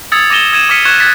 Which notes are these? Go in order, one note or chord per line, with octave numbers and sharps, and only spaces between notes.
D#6 E6 G#6 A6 C#7
D6 A#6 D#7 E7 G7
E6 G#6 D#7 E7
D6 D#6 F6 B6 C#7 D#7
C#6 F#6 G#6 D#7 E7 G7
F#6 G#6 A6 B6